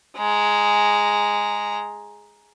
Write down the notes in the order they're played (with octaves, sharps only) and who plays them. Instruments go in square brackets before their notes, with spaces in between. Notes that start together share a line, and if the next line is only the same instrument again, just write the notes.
[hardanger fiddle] G#3 A#5